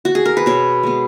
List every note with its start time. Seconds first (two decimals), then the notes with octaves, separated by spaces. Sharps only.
0.05 F#4
0.15 G#4
0.25 A#4
0.37 B4
0.46 B2 C#5
0.83 G#3 B3